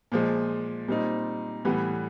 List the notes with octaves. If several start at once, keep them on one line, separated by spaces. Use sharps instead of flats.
A#2 F3 G#3
A#2 G3 C4 D#4
A2 E3 G3 B3